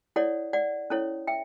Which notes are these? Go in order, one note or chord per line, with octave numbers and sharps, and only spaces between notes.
E4 A4 C#5 D5 F#5
D5 F#5
C#4 E4 A4 C#5
E5 G5